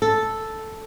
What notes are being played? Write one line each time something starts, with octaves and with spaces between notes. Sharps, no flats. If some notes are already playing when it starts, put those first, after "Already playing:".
A4